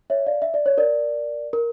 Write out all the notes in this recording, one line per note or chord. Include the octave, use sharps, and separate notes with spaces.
C#5 E5
D5 F5
E5
D5
C#5
A#4 D5
A#4